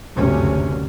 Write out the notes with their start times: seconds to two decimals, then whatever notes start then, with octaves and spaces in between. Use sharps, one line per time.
0.18 F#1 D2 G2 C3 C#4